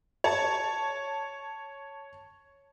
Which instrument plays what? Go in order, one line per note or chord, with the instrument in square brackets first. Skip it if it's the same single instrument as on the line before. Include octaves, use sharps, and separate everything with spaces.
[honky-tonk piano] C#5 A5